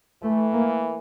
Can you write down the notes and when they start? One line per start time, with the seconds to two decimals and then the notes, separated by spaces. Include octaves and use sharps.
0.22 E3 A3
0.52 A#3